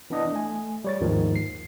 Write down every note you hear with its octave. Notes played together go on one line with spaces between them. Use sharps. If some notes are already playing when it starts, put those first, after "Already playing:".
E3 B3 D4 D#5 D#6
A3 G#5
G3 C#5 A6
D#2 G#2 D#3 F3 G#3
C7